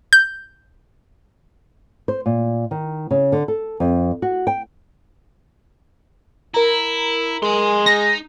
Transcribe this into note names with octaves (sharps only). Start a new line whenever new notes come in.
G6
C5
A#2
D#3
C#3
D3
A4
F2
F#4
G5
E4 A#4 A#5
G#3 G#5 C6
D#4 A#6